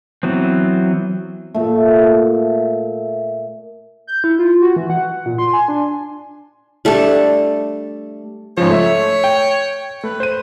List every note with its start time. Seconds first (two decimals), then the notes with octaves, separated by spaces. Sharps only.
0.23 E3 F#3 B3 C4
1.54 A#2 A3
4.07 G6
4.24 E4
4.39 F4
4.62 F#4
4.76 E3
4.90 F#5
5.26 A#2
5.38 C6
5.53 G#5
5.68 D4
6.85 G3 A3 D4 A4
8.57 G#2 C#3 F3 C#5
8.70 A3 E5
9.24 G5
10.04 A3 B4
10.20 C5 D#7